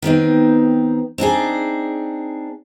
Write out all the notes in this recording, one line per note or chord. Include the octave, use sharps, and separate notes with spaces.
D#3 B3 C4 D#4
C4 D4 D#4 G#4